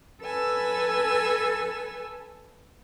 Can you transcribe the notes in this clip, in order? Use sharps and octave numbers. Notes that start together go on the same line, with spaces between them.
A4 B4 G#5 E6